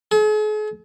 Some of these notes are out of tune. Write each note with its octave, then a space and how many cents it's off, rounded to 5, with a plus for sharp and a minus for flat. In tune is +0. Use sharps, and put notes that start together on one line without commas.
G#4 +45